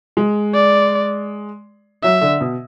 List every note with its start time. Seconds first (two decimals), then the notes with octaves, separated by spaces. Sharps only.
0.17 G#3
0.54 D5
2.03 F#3 E5
2.22 D3
2.41 B2